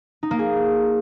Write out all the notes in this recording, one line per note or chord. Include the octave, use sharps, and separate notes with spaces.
D#4
A#3
G#4